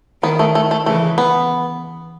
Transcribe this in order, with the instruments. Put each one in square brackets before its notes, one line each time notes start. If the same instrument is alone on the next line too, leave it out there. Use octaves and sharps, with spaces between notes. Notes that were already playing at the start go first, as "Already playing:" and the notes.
[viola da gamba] D#3 [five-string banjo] B3
[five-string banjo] A3
A3
A3
[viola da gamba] C#3 E3 [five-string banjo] A3
[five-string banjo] B3